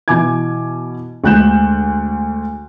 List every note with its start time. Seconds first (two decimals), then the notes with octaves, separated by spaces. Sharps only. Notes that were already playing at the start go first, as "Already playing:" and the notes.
0.08 B2 E3 G#5 D6 G#6
1.24 D2 G#3 F#6 G6 E7